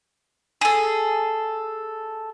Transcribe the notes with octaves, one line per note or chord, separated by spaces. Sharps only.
G#4 A4